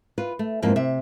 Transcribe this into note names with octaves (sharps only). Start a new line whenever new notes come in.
F4 B4
A3
F2 G#2 E3 A#3
C3 E5